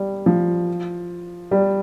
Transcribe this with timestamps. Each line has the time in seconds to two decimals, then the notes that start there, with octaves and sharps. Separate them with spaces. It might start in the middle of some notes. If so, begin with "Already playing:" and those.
Already playing: G3
0.26 F3
1.51 G3